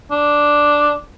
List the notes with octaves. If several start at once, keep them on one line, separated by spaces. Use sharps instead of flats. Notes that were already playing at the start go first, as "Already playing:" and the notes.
D4